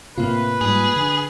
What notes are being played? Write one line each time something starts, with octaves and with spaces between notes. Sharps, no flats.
A2 C3 A#3 F4 B4
G#2 G3 G#4
D3